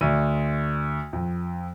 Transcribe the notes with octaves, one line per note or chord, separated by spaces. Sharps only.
D2 D#7
F2